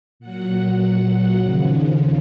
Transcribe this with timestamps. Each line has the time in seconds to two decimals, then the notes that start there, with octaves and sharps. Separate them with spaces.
0.20 A#2 F#3 F#5
1.41 D#2 C#3 F3